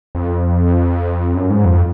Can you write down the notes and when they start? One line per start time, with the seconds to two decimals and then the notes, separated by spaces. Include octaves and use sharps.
0.15 F2
1.35 F#2
1.50 G#2
1.65 F2